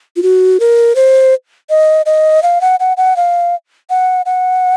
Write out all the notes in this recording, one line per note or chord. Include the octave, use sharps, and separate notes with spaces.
F4
F#4
A#4
C5
D#5
D#5
F5
F#5
F#5
F#5
F5
F#5
F#5